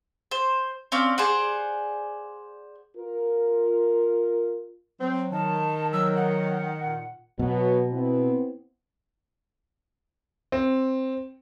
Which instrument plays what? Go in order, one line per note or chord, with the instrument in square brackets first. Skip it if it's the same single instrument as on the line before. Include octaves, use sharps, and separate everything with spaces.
[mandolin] C5
C4 C#4 D5 F5
G#4 C5 D5 F#5
[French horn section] F4 A#4
[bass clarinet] F#3 [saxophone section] C4
[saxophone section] D#3 [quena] A5
[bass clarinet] F#3 [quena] E6
[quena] F#5
[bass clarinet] A#2
[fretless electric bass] B2 [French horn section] F#3 B3
[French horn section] B3 C4 E4
[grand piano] C4